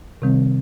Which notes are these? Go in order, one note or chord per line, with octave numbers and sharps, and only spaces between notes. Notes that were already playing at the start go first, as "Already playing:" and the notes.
C3 D#3 G3 C4